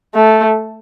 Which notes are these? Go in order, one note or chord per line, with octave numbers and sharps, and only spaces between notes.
A3